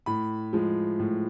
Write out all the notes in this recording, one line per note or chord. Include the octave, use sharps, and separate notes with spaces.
A2 B5
F3 G#3
A2